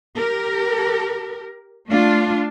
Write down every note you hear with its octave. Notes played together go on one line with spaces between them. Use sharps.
G4 A#4
A3 D4 F4